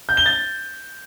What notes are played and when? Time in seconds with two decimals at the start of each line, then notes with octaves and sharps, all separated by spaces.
0.09 G6
0.17 G7
0.26 A6